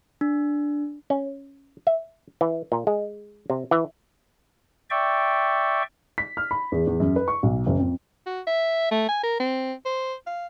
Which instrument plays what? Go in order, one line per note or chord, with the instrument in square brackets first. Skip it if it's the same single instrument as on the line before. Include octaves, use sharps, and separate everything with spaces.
[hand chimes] D4
[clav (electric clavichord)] C#4
E5
E3
A#2
G#3
C3
E3
[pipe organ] D5 E5 G5 C#6
[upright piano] B6
F6
B5
E2
E2
F#2
B4
C#6
B1
F#1
F2
[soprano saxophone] F#4
E5
A3
G#5
A#4
C4
C5
F5